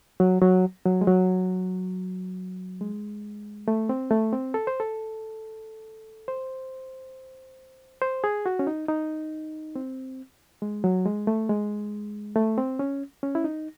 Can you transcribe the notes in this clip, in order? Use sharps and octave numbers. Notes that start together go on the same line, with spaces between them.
F#3
F#3
F#3
G#3
F#3
G#3
A3
C4
A3
C4
A4
C5
A4
C5
C5
G#4
F#4
C#4
D#4
D#4
C4
G#3
F#3
G#3
A3
G#3
A3
C4
C#4
C#4
E4
D#4